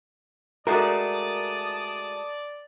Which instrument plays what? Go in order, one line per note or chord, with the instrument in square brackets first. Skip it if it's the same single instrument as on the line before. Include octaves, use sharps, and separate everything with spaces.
[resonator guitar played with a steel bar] G#3 A3 F#4 [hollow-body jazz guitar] A#4 [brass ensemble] D5 [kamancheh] A5 D#6